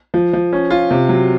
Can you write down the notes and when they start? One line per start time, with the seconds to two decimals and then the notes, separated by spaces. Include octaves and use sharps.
0.14 F3
0.33 F3
0.52 C#4
0.70 F4
0.91 C3
1.09 F#3